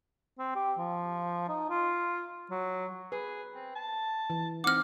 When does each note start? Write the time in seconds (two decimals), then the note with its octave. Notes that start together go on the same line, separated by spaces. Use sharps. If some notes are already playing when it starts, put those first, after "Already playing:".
0.39 C4
0.55 G4
0.78 F3
1.49 D#4
1.70 F4
2.50 F#3
3.12 G#4 B4
3.54 C4
3.75 A5
4.30 E3
4.64 C4 D#4 F#5 D6 F6